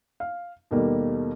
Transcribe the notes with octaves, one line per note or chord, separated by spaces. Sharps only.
F5
D#2 B2 G3 A3 A#3